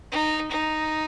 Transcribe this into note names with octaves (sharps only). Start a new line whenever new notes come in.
D#4
D#4